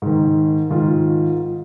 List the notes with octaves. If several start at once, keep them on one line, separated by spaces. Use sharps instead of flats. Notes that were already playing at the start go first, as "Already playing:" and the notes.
G#2 D#3
G#2 D#3 F4